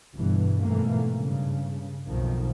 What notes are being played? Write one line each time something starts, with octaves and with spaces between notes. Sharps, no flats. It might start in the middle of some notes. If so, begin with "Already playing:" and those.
G1 G2 B2 E3
F2 G#2 B2 E3 A3 A#3
G2 C#3
B1 F2 B2 D#3 F3